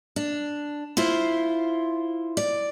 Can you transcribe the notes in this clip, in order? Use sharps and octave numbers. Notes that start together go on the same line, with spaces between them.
D4
E4 F4 C5
D5